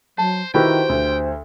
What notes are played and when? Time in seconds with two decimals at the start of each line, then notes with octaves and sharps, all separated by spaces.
0.18 F#3 C5 A5
0.54 D#3 E4 F#4 G4 B4 C5 G5
0.89 D2